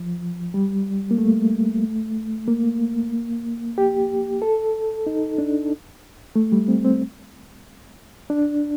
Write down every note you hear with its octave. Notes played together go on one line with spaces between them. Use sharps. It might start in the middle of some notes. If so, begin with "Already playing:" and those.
Already playing: F3
G3
A#3
A3
A#3
G4
A4
D#4
D4
A3
G3
C4
C4
D4